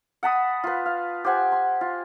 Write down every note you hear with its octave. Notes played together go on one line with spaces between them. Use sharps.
F#5 A5 B5 D#6
F4 B4
F5
G4 C5 F#5 G#5
C6
F4